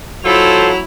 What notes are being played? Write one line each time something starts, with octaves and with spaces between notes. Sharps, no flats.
F#3 E4 F4 A4 C5 F7